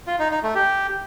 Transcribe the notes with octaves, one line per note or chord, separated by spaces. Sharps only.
F4
D#4
D#4
A3
G4